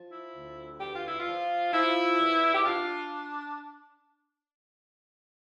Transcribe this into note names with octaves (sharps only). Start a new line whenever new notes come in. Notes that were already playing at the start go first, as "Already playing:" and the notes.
Already playing: F3
E4
D2
E2 G4
F4
E4
F4
F3
F3 E4
E2
G4
D4 F4